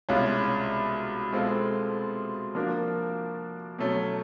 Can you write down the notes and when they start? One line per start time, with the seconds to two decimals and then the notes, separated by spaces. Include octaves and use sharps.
0.09 C2 B2 G#3 C#4 F4
1.32 B2 G#3 C4 F4 A4
2.55 F3 A#3 D4 F#4 A#4
3.79 B2 F#3 A3 C#4